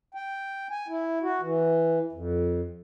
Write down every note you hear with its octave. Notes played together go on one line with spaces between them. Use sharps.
G5
G#5
E4
F#4
E3
F2